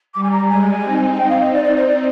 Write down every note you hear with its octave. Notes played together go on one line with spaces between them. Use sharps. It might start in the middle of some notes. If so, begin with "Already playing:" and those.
G3 D6
G#5
A#5
G#3 G#5
C4 D#4
G#5
G5
F5
D#5
D5
D5
C5
D5